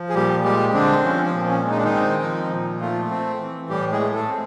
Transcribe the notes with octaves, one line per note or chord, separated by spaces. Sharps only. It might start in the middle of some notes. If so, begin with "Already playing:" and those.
Already playing: F3
G#4
A#2 G3 G4
G3 G#3 G4
D3 C4 D4
F3 C#4
C4
A#2
C#4
G#3
D#4
D4
D#3 D#4
C4
F3
A#2
F3 A3 F4
C4
E3
A2 G3 G4
G#3 G#4
A3
A3 A4
C4